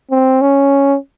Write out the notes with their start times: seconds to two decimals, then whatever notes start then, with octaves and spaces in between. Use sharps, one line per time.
0.11 C4
0.42 C#4